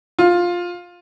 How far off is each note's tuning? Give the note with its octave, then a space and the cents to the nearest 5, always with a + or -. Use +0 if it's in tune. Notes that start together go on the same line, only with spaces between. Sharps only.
F4 +10